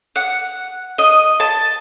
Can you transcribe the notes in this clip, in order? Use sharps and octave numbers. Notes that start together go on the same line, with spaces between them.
F#5
D#5
A5